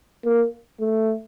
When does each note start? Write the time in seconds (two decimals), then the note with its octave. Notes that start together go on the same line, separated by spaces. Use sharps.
0.25 A#3
0.80 A3